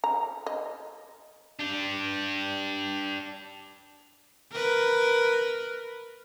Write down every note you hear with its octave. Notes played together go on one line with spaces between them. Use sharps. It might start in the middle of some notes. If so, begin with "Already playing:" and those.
A#5
D#5
D4 G4
A#4 B4